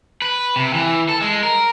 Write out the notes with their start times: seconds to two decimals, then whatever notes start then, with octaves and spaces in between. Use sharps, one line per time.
0.22 B4
0.56 C3
0.74 E3
1.09 A4
1.22 G#3
1.43 A#4